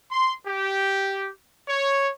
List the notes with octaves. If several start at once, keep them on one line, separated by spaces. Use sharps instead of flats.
C6
G4
C#5